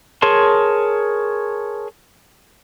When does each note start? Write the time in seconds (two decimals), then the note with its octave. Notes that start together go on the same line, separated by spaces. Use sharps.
0.22 G#4 A#4 C#5 A5 C6